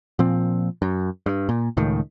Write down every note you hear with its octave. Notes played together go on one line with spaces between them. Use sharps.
A#2 F3 C4
F#2
G2
A#2
C#2 A2 D#3